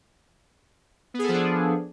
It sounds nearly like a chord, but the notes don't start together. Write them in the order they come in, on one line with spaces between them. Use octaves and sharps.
B3 G#4 A4 F3 D4